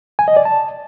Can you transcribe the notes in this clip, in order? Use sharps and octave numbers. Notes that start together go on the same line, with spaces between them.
G#5
D#5
D5
A5